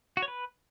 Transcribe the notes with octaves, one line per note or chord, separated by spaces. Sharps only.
F#4
C#5
B4